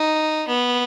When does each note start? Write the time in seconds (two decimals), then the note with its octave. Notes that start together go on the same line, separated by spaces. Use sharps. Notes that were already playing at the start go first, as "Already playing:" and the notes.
Already playing: D#4
0.48 B3